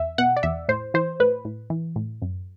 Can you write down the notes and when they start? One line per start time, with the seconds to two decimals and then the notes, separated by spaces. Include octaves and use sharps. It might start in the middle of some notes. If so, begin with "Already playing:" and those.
Already playing: E2 E5
0.18 B2 F#5
0.37 D5
0.43 E2 E5
0.69 A2 C5
0.94 E3 C5
1.20 A2 B4
1.45 A2
1.70 E3
1.96 A2
2.22 F#2